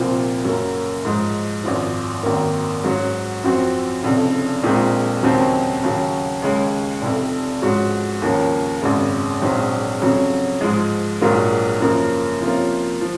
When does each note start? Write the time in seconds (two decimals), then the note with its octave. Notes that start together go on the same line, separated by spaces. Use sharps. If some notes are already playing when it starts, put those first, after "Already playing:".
Already playing: C2 A#2 F3 C4
0.44 F#2 C#3 F#3 A#3
1.05 G#2 F3 G#3 D#4
1.63 G#1 F#2 F3
2.23 G#1 F#2 D#3 A#3
2.84 G#2 F#3 C#4 F#4
3.44 F#2 F3 C4 F#4
4.03 F1 F2 C#3
4.63 A#1 A#2 G#3 C4 D#4
5.23 D#2 C#3 F#3 C4 D#4
5.83 D#2 C#3 F#3
6.42 D#2 C#3 G#3 C#4
7.02 F1 F2 C3
7.62 G#2 F3 G#3 C#4 F#4
8.22 D#2 C#3 F3 A#3 C#4
8.82 G#1 F#2 C#3 G#3
9.42 A#1 G#2 F#3 C4
10.01 F2 C#3 F#3 C#4
10.61 G#2 F3 G#3
11.21 A#1 G#2 F#3 A#3 F4
11.81 F#2 C#3 F3 A#3
12.41 C3 F3 A#3 C#4 F4
13.01 F3